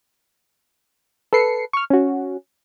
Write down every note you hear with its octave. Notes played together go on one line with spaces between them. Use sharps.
A4 B4 C7 C#7
C#6 F6
C#4 F#4